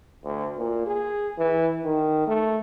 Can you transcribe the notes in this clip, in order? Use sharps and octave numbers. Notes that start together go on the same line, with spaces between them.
D2
A#2
G#4
E3
D#3
A3